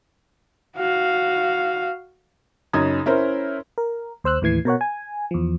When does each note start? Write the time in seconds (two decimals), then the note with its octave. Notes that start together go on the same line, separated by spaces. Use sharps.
0.77 F#4 F5
2.73 F#2 C#3 D#4 D#6 G#6
3.06 C#4 E4 A#4 C5
3.78 A#4
4.24 D#2 C5 E6 F#6
4.42 D#2 A2 E3 G#6 C7
4.65 B2 A#4 C#5 F#5
4.81 G#5
5.31 E2 F3